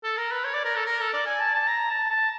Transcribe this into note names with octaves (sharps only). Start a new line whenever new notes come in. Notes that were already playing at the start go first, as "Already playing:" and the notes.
A4
A#4
B4
C#5
D5
A#4
A4
A#4
A4
D5
G#5
A5
A5
A#5
A5
A5